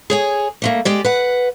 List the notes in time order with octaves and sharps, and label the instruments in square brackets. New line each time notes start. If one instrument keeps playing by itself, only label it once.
[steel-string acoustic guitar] G#4 C#5 G#5
G3 A3 A#3
G#3 G4 D5
B4 F#5